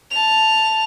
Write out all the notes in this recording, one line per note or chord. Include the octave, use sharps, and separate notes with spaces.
A5 F7